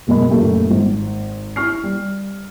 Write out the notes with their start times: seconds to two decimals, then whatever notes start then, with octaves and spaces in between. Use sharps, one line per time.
0.07 F#1 B2 G#3 A#4 D#5 B5
0.30 F#1 A#2 A3 A#3 G4
0.71 G#1
1.56 E4 C#6 F6 C7
1.83 G3